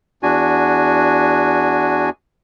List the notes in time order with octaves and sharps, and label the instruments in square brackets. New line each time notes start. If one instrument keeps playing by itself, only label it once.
[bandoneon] E2 D4 F#4 G#5